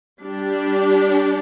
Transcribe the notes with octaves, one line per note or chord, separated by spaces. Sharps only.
G3 D4 G4 D5